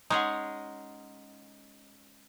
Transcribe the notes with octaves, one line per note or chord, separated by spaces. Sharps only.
G#3 C#4 D#4 G#4 F#5 C6 C#6